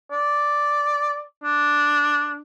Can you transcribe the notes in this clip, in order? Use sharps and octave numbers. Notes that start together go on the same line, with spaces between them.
D5
D4